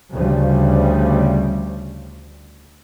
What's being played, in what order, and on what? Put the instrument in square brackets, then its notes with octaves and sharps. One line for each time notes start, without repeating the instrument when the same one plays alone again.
[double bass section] D2 C#3 F3 G3